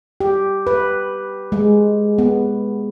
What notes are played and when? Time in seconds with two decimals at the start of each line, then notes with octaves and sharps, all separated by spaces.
0.20 G4
0.67 B4
1.52 G#3
2.18 B3